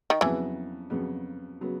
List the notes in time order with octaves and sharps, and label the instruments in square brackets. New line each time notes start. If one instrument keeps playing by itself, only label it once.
[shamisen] D#3
[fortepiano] F2 C#3 F#3 B3 [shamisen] E3
[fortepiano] F2 C#3 F#3 B3
C#3 F#3 B3